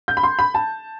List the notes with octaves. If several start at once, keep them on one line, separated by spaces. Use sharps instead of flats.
G6
B5
C6
B5
A5